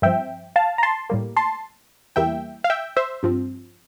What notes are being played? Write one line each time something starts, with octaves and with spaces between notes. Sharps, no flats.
G2 F3 C4 E5 G5
F5 A5
A#5
A5 C6
A2 G3 A#3
A5 C6
E2 E3 G3 A#3 E5 G5
F5
E5 G5
C5 E5
G2 F3 C4